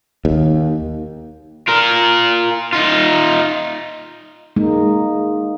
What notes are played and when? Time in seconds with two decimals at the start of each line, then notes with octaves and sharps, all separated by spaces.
0.25 D#2
1.68 F4 A#4
2.73 D#4 F4
4.56 G#3 A#3 D#4